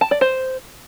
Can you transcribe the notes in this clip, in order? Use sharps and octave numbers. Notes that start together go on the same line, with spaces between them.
A5
D5
C5